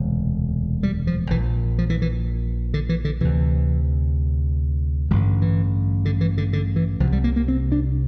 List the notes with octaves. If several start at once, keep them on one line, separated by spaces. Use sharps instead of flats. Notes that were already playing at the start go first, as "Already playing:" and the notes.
Already playing: E1 D2 C3
G3
F3
A#1 A#2 E3
F3
E3
E3
D3
E3
D3
D2 C3 E3
A1 G2 D3 F3
E3
D3
E3
D3
D3
E3
C2 C3 F3
G3
A#3
A#3
C4
D4